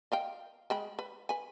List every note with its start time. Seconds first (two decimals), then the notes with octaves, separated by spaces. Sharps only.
0.12 D#5 F5 G5
0.70 G#3 G5 B5
0.99 B4
1.29 B4 G#5